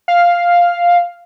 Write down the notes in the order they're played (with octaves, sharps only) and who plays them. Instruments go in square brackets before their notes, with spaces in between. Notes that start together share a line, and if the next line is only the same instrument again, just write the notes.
[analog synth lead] F5